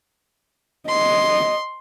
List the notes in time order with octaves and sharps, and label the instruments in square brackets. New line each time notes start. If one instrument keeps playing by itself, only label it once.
[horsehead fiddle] D#5 [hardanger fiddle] C6